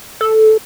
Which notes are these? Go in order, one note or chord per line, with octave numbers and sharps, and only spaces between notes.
A4